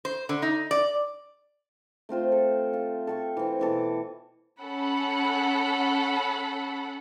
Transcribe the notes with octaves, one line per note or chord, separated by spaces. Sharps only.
C5
D3
D#4
D5
A3 C4 F4 C5
A4
F5
A4 G5 C#6
E3 C4
B2 E3 A4 D6
C#4 A4 F#5 B5